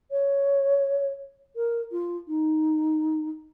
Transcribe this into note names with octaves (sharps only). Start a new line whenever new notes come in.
C#5
A#4
F4
D#4